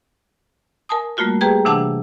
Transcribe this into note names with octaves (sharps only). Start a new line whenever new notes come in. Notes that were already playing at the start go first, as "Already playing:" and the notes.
A#4 G#5 A5 D#6
G3 A3 A#3 F4 F#4 A#4
G4 G#4 B4 G5 A#5 G#6
C3 E3 D4 F#5 A5 E6